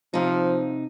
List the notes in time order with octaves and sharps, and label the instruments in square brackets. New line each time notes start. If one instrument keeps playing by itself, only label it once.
[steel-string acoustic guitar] C3 D#4 [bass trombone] F3